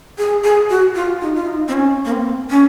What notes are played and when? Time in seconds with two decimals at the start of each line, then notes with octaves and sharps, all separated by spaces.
0.18 G#4
0.44 G#4
0.70 F#4
0.95 F4
1.21 D#4
1.35 F4
1.47 D#4
1.68 C4
1.73 C#4
2.05 A#3
2.12 C4
2.50 C#4